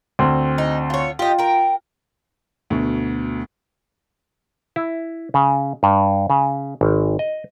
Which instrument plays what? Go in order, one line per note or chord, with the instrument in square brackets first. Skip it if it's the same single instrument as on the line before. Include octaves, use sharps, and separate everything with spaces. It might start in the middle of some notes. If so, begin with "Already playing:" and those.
[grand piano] D2 C4
[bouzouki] D#4
F4 C#5
[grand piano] F4 [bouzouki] G4 D#5
[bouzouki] A#4 G5
[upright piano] D2 B2
[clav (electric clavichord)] E4
C#3
G2
C#3
G#1
D#5